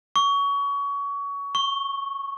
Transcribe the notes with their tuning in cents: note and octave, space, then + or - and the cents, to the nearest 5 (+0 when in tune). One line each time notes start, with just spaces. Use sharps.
C#6 +25
C#6 -10